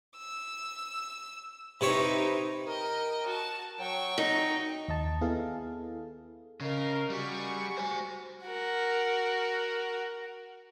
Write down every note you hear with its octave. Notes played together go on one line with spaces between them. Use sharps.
E6
C3 D#4 E4 B4 C#5
A#4 D#5 G5
F#4 A5
F#3 G5 C#6
D#4
D#2 D#5 A5
B3 E4 G#4 A4 F5
C#3 A#4 D#5 F5
G3 F#4 G#4 C#6
C5 G#5
F#4 A#4